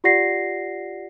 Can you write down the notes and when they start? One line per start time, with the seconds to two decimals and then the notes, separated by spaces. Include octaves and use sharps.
0.04 F4 G4 D5 F#5 A#6 C7